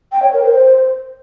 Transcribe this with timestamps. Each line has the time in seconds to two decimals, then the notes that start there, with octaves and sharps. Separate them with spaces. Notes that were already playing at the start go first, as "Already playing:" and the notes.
0.12 G5
0.22 C#5
0.33 A#4
0.44 C5